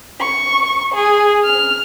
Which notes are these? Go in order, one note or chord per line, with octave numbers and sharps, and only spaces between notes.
C#6
G#4
F6